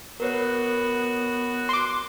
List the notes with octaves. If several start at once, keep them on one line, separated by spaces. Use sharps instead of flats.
B3 F#4 A#4 B4 C#5
C6 D6